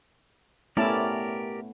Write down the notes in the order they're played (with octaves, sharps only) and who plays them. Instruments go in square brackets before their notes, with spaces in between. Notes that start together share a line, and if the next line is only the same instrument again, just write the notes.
[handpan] A3 B3 [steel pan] C#4 E4 A5 [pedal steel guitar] G4 A#4 D5